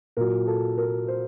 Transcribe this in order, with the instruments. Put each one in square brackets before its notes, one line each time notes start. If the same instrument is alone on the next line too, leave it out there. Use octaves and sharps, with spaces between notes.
[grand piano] A#2 F#3 A#4
A4
A#4
C5